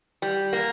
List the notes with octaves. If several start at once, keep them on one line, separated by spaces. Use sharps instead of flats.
G3
A#3